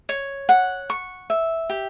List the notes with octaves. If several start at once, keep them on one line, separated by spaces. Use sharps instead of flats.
C#5
F#5
C#6
E5
G4